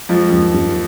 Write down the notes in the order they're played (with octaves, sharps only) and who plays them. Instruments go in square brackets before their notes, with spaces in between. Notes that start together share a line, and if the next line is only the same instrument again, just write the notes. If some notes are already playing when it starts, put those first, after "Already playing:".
[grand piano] F2 F3 [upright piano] G#3
[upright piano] D#2
D#2